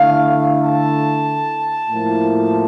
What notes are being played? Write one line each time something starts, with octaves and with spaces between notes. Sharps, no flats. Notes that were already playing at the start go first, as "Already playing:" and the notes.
Already playing: D3 A3 E4 F5
A5
A2 F3 A#3 E4